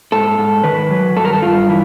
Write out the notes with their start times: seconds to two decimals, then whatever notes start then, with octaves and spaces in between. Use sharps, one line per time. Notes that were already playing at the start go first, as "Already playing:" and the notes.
0.12 G#2 A4
0.38 G#2
0.64 D#3 B4
0.91 F#3
1.16 G2 A4
1.25 A#4
1.33 A4
1.42 G2 F4
1.69 E3